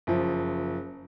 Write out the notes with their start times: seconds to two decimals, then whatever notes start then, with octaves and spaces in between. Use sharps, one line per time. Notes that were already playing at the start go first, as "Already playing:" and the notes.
0.07 F#1 F3